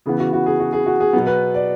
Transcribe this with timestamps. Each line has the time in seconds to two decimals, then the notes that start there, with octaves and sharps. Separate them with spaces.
0.06 C#3 E3 B3 G#4
0.19 F#4
0.33 F#4
0.46 G#4
0.60 F#4
0.73 G#4
0.86 F#4
1.00 G#4
1.13 B2 F#3 B3
1.27 B4
1.54 D5